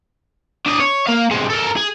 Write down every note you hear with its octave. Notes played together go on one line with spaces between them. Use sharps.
D4 D#5
C#5
A#3 F5
C3 G#3
A4 A#4
G#4